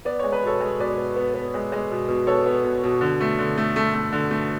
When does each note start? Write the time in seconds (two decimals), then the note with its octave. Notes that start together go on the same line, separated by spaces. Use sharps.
0.05 B3 D5
0.20 G#3 C#5
0.33 B4
0.43 B2 A4 C#5
0.61 G#3
0.79 B2 B4 D5
0.98 B3
1.16 B3
1.35 B3
1.54 G#3
1.72 G#3
1.91 B2
2.08 B2
2.27 B3 A4 C#5
2.46 B3
2.64 B2
2.83 B2
3.01 D3
3.21 A3
3.39 D3
3.58 A3
3.76 A3
3.94 A3
4.13 D3
4.31 A3